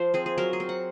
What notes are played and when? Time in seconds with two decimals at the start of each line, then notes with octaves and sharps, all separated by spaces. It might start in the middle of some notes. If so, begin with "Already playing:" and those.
Already playing: F3 C5
0.14 C4 G#4
0.26 G#4
0.38 F#3 A#4
0.53 G#4
0.60 C4
0.69 F#5